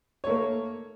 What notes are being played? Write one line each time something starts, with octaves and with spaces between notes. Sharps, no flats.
A3 A#3 C#5